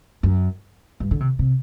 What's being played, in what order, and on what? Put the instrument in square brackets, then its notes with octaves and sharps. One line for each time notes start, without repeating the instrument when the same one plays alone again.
[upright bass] F#2
G2
D3
C3
C3